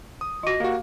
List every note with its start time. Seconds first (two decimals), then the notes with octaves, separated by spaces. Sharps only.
0.21 D#6
0.43 F4 F#4 D#5 A#6
0.60 A#3 F#4 G4 F5